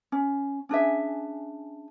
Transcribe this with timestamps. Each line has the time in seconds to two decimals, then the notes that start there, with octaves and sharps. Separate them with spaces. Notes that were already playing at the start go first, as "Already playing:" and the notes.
0.12 C#4
0.69 C#4 D4 G#4 E5